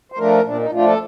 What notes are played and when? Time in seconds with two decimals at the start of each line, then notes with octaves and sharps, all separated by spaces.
0.12 C5
0.18 F3 A3 D4 A#4
0.45 A#2 D4
0.59 D#4
0.72 F3 A3 D4 F4
0.86 A4